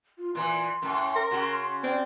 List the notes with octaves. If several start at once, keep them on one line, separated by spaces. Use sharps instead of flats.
F4
A#2 E3 C6
F#2 A2
A#4
C#3 F#4
C4 D5